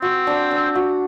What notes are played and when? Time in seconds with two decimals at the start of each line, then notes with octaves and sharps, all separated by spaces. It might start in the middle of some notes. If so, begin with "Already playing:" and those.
0.02 C4 F#4
0.27 D4
0.51 D4
0.75 F#4